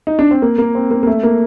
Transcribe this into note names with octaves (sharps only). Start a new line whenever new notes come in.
D#4
D4
C4
A#3
A#3
C4
A#3
A#3
A3
A#3